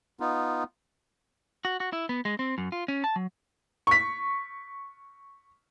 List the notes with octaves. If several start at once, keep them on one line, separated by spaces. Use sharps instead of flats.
B3 D#4 F4
F#4
F#4
E4
B3
G#3
C4
F#2
F4
C#4
A5
F#3
C#6 B6